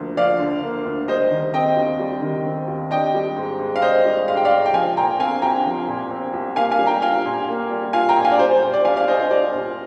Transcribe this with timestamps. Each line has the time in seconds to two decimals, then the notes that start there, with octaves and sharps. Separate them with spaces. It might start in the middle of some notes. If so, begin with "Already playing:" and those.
Already playing: D2 D3 F3 A#3
0.17 F3 D5 F5
0.39 D3
0.63 A#3
0.85 D2
1.08 G3 C5 D#5
1.31 D#3
1.54 C4 D#5 G5
1.76 D#2
1.99 G3
2.22 D#3
2.45 C4
2.68 D#2
2.91 D4 D#5 G5
3.14 G3
3.36 G#2
3.60 G#2
3.76 F5
3.82 D4 C5 D#5
4.05 G3
4.28 G#2 F5
4.37 G5
4.45 D5 F5
4.51 G#2
4.66 G5
4.73 F3 F5 G#5
4.97 A#2 G5 A#5
5.19 C4 F5 G#5
5.42 C2 G5 A#5
5.65 F3
5.88 A#2
6.11 C4
6.33 C2
6.56 A#3 F5 G#5
6.71 F5 G#5
6.79 G3
6.86 G5 A#5
7.02 F4 F5 G#5
7.26 A#2
7.48 A#3
7.71 G3
7.93 F4 F5 G#5
8.09 G5 A#5
8.17 A#2
8.25 F5 G#5
8.32 D5
8.39 G3 C5
8.51 C5
8.62 A#2 C5
8.74 D5
8.85 C2 F5 G#5
8.96 D5 F5
9.07 C2 C5 D#5
9.19 C5
9.31 G3 D5
9.53 A#2